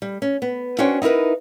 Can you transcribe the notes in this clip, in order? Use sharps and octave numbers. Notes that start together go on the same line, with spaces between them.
G3
C#4
B3
C#4 D4 F#4 C5 C#5 G5
D#4 E4 G4 A#4 B4